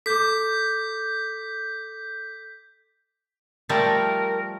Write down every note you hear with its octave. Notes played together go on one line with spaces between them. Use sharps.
A4 D6 G6 B6
F3 G3 A3 A#4